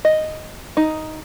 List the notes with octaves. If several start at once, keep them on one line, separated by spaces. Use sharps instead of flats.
D#5
D#4